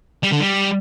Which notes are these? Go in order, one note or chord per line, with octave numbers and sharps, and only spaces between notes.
G3
D3
G3